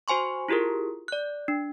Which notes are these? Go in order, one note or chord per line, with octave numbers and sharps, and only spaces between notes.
F#4 C5 G#5 C6 C#6
E4 F4 G4 G#4 A#4
D5 F#6
D4